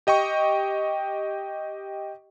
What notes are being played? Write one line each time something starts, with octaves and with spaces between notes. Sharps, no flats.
G4 D#5 G5 C#6